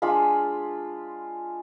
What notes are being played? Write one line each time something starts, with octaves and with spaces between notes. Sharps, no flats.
G#3 D4 F4 B5